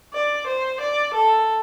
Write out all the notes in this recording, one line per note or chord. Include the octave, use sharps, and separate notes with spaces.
D5
C5
D5
A4